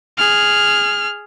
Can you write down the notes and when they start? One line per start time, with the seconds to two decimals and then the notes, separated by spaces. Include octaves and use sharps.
0.18 G#4 F6